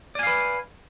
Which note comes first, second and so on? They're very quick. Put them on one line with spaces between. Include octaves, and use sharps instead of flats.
D5 G#5 F5 B4